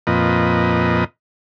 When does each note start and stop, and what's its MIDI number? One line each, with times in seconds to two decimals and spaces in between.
0.07 1.04 41
0.07 1.04 46
0.07 1.04 71
0.07 1.04 75